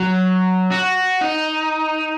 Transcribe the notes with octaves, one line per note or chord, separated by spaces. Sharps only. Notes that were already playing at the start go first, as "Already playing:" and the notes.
Already playing: F#3
F#4
D#4